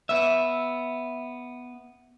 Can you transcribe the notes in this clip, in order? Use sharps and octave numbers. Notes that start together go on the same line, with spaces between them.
B3 E5